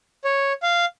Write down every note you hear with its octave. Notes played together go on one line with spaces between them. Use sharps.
C#5
F5